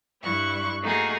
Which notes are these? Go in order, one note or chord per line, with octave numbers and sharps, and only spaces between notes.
G2 E4 C#6 F#6
A3 A#3 D#4 F#4 G#4